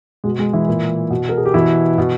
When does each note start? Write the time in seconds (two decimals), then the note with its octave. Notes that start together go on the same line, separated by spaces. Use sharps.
0.24 B2 G#3
0.39 G#3
0.53 E3 E4
0.68 A#2
1.10 B2
1.29 A#4
1.37 G#4
1.45 G4
1.54 B2 E3 E4
1.98 B2